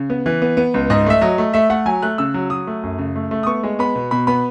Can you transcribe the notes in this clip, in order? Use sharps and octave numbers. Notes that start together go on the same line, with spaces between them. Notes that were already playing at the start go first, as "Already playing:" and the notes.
Already playing: C#3
B3
E3
B3
B3
C#2
G#2 D#5
A3 E5
F#3 D#5
A3
A3 E5
A3 F#5
F#3 G#5
A3 F#6
C#3 E6
F#3
F#3 D#6
A3
F#2
C#3
A3
A3
D#6
B3 C#6
G#3
B3 B5
B2
B2 B5
B3 B5